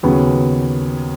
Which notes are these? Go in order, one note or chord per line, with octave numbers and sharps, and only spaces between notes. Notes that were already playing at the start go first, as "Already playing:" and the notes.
D#2 C#3 F#3 B3